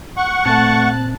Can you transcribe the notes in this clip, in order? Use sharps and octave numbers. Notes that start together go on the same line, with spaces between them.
F#5 C#6
A#2 A3 C4 A5 F#6